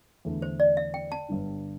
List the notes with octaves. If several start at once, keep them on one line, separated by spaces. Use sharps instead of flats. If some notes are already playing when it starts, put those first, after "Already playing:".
E2 D3 A3 E4
C5
D5
E5
G5
A5
G1 G2 D3 G3 D4